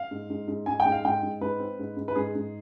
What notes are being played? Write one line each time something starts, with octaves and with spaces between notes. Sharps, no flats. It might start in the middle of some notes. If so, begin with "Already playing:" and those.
Already playing: F5
G#2
G#2
G#2
G#2 G#5
G5
G#2
F5
G#2 G5
G#2
G#2 B4
C4
G#2
G#2
B4
G#2 G#4
G#2